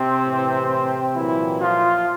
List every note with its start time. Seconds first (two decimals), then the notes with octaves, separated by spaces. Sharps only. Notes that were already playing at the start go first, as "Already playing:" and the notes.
Already playing: C3 C4
0.25 A2
0.30 E3
1.15 A#2 E3 F#3 E4
1.60 F3 F4